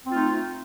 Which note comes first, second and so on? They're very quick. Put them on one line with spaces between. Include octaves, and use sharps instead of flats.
C4 F4 A3 D#4